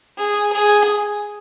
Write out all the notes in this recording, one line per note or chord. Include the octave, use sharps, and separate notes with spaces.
G#4
G#4